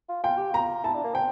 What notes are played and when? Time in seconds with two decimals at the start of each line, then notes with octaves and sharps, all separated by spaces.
0.09 F4
0.24 F4 G5
0.38 G4
0.52 F4 A#5
0.84 E4 A5
0.95 D4
1.04 A#3
1.14 C4 G5